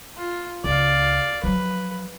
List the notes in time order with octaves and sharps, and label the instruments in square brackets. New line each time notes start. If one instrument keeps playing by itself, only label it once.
[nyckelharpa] F4
[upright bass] C#2 [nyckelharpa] D5 F5
[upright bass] F3 F#3 [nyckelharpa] B4